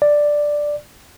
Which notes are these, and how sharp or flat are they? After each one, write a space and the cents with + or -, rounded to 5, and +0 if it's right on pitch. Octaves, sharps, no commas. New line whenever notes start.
D5 +5